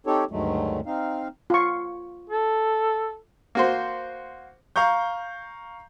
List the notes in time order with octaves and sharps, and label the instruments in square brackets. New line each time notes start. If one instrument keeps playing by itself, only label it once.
[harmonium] C4 D#4 G4 A4 C#5
D2 G2 D#3 F#3 G#3 A3
C4 D#4 F5
[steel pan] F4 C#6
[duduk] A4
[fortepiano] A#3 F#4 C5
[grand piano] F5 A#5 C#6 G6